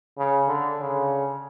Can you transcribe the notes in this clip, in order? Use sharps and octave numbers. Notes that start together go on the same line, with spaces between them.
C#3
D3
C#3